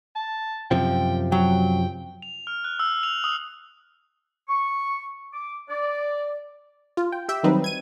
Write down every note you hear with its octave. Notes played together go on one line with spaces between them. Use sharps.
A5
F#2 C3 F3 G5
F#3 G5
F7
F6
F#6
E6
F7
D#6
C#6
D6
D5
F4
G5
G4 E5 G5
D#3 F#3 G3 C4 D#4 B4
G#6 D#7